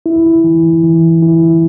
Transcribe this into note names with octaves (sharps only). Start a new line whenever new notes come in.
E4
E3
E3
E4